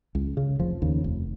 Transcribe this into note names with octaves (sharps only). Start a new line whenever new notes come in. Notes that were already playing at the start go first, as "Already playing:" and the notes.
C#2
C#3
F1 F3
D#2 C#3
F1